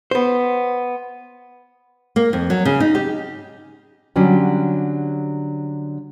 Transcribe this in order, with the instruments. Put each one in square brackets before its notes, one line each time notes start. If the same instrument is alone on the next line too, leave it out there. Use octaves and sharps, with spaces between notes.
[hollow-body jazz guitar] B3 C5
[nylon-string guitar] A#3
F2
F#3
C#3
D#4
G4
D3 F#3 G3 C#4 G4